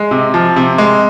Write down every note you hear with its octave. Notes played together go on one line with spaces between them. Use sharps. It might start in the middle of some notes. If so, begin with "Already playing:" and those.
Already playing: G#3
C3
F3
C3
G#3